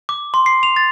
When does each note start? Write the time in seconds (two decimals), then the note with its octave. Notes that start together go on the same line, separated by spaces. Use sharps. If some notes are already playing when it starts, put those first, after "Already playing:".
0.09 D6
0.34 C6
0.46 C7
0.63 F7
0.76 A6